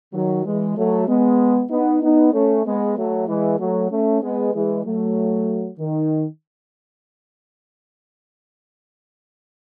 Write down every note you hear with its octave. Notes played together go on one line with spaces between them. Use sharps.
D#3 F#3
E3 G#3
F#3 A3
G#3 B3
B3 D#4
B3 D#4
A3 C#4
G#3 B3
F#3 A3
E3 G#3
F#3 A3
A3 C#4
G#3 B3
E3 G#3
F#3 A3
D#3